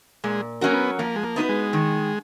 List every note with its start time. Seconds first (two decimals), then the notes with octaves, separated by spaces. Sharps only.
0.24 A#2 G#3
0.61 F#3 A#3 C#4 F#4 A#4
0.73 B3
0.99 F3 A#3
1.16 G#3
1.24 A#3
1.36 B3 D#4 F#4 B4
1.49 G#3
1.73 D#3